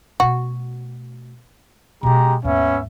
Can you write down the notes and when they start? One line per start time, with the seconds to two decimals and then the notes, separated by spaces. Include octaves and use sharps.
0.20 B2 A3 F#4
2.03 B2 G#3 C#4 G4 A#5
2.44 D#2 G#2 B3 C#4 E5